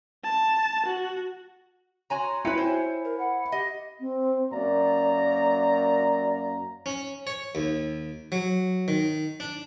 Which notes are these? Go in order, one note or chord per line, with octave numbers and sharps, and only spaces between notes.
A5
F#4
F#4 C#5 G#5 A#5 C6
C4 E4 F#4 B4 D#5 G5 C#7
C5 G#5
A#4
F#5 B5
G4 D#5
C4
F#2 A#3 D5 A#5
C#4
C#5
D#2
F#3
D#3
D4